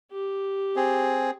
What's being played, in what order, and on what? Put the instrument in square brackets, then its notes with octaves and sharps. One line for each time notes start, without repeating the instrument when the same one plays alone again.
[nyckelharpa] G4
[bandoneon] C4 G#4